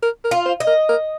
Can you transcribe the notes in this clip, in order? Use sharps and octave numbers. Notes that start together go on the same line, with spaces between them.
A#4
A#4
F4
C5
D#5
A#4
A#4